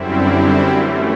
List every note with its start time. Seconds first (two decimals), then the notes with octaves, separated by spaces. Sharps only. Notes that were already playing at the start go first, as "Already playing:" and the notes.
Already playing: F#2 D3 G3 C4 E4
0.71 F#2 E3 A3